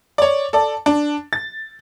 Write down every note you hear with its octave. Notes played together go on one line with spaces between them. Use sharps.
C#5 D5
A4 D5
D4
A6